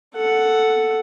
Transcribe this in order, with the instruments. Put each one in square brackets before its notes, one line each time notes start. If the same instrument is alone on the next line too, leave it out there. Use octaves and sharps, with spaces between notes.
[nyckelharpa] A4 F#5